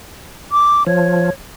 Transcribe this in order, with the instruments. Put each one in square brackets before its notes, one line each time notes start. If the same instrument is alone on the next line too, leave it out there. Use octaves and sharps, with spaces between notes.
[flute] D6
[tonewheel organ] F3 [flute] C#5